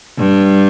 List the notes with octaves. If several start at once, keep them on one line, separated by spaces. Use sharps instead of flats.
G2